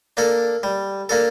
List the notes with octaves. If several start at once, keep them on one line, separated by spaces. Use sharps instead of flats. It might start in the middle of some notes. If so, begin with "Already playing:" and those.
A#3 D4 A4
G3
A#3 D4 A4